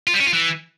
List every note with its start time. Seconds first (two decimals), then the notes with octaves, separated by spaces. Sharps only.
0.07 F4
0.14 G3
0.20 C#4
0.26 F4
0.33 E3